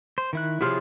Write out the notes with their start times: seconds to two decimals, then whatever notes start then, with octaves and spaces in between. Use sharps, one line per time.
0.18 C5
0.33 D#3 E4 F#6
0.61 C3 F3 E4 F4 G#4 C#5